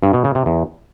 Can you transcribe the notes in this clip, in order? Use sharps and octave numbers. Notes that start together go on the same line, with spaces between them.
G2
B2
C#3
C3
E2